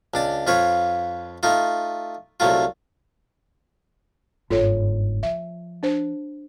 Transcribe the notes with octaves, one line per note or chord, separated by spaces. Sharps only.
C#2 D4 A5
F2 F4 B4 C#5
A3 D#4 F4
C2 F#3 A3 F4
G1 G#2 F4 A4 C#5
F3 E5
D4 C5